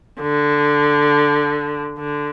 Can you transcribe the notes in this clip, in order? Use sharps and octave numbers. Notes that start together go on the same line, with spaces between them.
D3
D3